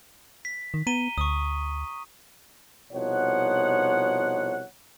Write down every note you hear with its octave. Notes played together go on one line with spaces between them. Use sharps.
B6
D#3
B3 A#5 D#7 G7
D2 C#6 D#6
C2 B2 F3 D#4 C#5 F#5